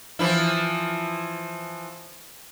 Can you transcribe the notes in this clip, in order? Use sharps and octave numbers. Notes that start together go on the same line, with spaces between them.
E3 F3 E4